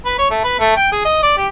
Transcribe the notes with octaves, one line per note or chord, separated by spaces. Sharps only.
B4
C#5
A3
B4
A3
G5
G#4
D#5
D5
G4